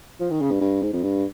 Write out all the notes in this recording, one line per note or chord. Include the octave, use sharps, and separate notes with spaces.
F3
D#3
C#3
G2
G2
G#2
F2
G2